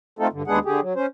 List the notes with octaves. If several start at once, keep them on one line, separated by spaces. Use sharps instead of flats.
A3 C4 D#4 F4 A4
G2 D3
D#2 G#3 B3 D4 G#4 F#5
D3 G4 G#4
F#3
C#4 C5